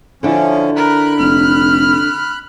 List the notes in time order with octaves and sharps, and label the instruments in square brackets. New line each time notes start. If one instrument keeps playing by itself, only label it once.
[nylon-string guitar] D3 D4 E4 [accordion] F3 C#4
[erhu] A#4 [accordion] B5 F#6
[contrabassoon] F1 [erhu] F6